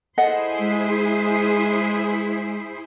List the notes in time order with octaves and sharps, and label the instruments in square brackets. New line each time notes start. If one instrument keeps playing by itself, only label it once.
[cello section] E4 G#4 C5 [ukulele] A4 D#5 F#5
[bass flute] G#3